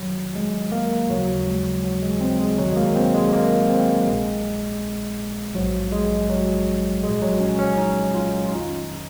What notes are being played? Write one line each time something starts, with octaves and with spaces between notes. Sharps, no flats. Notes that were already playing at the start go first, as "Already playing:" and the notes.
Already playing: F2 C3 D#3 F#3
G#3
A#3
D#2 C#3 F3 F#3
G#3
F#3
G#3
C4
G#3
C#2 C3 D#3 F#3
G#3
A#3
C4
G#3
A#3
C4
A#1 A#2 F3 G#3
A#1 G#2 F3 F#3
G#3
F#3
C2 A#2 F3 G#3
F#3
C#4
C#4
D#4
F4
F4
F2 D#3 D#4